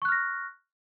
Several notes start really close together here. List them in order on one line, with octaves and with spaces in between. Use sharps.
C#6 F#6 F6 A#6